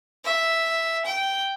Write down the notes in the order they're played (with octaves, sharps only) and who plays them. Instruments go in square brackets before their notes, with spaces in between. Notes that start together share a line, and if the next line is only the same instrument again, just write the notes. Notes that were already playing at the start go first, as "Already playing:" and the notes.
[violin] E5
G5